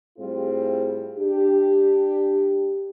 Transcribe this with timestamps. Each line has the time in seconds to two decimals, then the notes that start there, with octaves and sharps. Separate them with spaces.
0.19 A2 G3 C4 F4 G#4
1.18 D4 G4